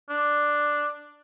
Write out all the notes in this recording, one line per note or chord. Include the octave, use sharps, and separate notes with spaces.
D4